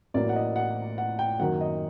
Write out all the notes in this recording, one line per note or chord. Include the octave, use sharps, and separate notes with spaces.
A1 A2 F#3 A#3 D5
F#5
D#5
F#5
F#5
G5
F#2 D#3 F#3 A#3 F#5
D#5